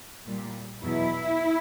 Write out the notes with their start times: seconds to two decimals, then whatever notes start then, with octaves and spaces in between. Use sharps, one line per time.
0.27 A#2 G3
0.82 E2 B2 F#3 E4